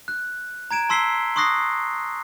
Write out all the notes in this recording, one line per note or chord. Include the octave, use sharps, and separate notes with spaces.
F#6
A#5 G#6 D7 E7
A5 C6 E6 B6 C7 G7
C6 C#6 D#6 F#6 A#6 C7